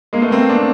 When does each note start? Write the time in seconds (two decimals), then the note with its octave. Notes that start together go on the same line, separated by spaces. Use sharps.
0.13 G#3 A#3
0.22 A3 B3
0.31 A#3 C4
0.50 C4 D4